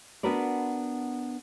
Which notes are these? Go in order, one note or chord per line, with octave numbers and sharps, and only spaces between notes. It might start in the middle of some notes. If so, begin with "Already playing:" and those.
B3 D4 F#4 A#4 B4 D5